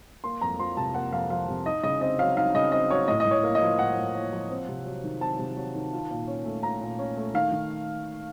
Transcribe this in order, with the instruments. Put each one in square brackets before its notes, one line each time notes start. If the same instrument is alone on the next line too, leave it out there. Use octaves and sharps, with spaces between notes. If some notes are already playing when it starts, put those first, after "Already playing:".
[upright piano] A#3 C6
F2 A#5
F3 C6
C3 A5
A#3 F#5
F2 F5
F3 F5
C3
D#4 D#5
C#3 D#5
C4 D#5
F#3 F5
D#4 F5
C#3 D#5
C4 D#5
F#3 C#5
A2 D#5
D#5
A2
C#5
A#3
D#5
F3
A2 F#5
A2
A#3
F3
C4
C3
F#3
D#3
C4 A5
C3
F#3
D#3
F4
A#2
C#4
A3
F4 A#5
A#2
C#4
A3
D#3 F5
D#3